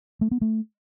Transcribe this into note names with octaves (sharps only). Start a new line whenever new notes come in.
A3
B3
A3